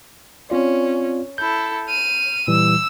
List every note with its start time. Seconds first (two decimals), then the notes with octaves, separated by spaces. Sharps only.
0.50 C4 C#4 F4 D5
1.38 E4 A4 G6
1.88 F6 D#7
2.48 A#2 E3 G3 E6